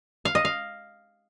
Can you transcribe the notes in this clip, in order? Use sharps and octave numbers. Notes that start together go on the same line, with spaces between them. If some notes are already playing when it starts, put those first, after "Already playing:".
F5
D#5
F5